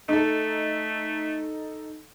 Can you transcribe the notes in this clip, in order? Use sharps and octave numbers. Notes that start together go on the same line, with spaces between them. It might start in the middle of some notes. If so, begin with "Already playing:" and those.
A3 D#4 A4